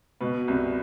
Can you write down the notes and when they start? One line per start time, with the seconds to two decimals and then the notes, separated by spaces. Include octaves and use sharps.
0.21 B2 B4
0.48 C2